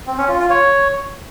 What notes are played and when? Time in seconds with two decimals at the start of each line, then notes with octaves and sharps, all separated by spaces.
0.07 C4
0.17 C#4
0.28 F4
0.39 F4
0.50 C#5